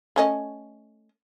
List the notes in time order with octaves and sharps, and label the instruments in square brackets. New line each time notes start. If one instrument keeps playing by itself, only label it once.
[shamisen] A3 C#4 D#5